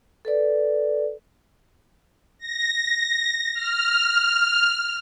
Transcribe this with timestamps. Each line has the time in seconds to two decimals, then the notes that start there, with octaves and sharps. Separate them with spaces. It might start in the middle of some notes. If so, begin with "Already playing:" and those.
0.25 A4 B4 D5
2.39 A#6
3.54 F6